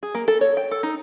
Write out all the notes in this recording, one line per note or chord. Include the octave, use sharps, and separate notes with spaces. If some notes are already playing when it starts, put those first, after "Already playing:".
G#4
A#3
A4
C#5
G5
A4
D#4